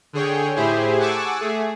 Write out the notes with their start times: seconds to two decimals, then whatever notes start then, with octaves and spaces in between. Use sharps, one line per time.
0.13 D3 G#4 C#5 G5
0.56 A2 E4 G4 G#4 C5
0.99 F#5 G#5 A5 C#6 D6 E6
1.40 A3 G#4